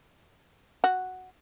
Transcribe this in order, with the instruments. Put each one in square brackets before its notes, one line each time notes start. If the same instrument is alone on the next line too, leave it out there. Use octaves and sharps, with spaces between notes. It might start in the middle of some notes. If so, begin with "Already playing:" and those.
[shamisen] F#4